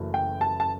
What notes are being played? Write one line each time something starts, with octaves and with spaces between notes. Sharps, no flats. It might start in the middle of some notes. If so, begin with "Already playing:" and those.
Already playing: F#1 F#2 E3 A3
G5
A5
A5